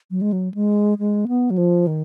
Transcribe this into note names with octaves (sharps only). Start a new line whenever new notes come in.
F#3
G#3
F#3
G#3
G#3
B3
F#3
F3
D#3